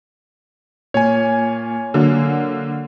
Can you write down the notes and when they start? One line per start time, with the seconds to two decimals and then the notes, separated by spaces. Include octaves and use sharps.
0.94 A#2 C#5 G#5
1.94 D3 F#3 A#3